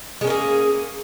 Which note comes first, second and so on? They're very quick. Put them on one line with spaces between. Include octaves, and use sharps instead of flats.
G#3 C#4 A#3 G#4